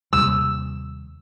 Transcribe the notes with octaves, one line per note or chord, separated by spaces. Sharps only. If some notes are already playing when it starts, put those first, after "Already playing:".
D#2 C3 G3 E6